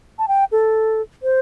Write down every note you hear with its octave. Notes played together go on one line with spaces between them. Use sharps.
A5
G5
A4
C5